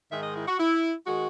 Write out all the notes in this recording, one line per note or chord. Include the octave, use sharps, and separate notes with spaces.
G#2 D#3 G#3 D#4 E5
D#5
E4
F#4
E4
D#3 G#3 F#4